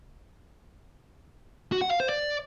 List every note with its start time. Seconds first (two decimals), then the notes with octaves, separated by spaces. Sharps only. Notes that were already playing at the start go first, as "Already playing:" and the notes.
1.72 F#4
1.81 F#5
1.91 F5
2.00 C5
2.09 D5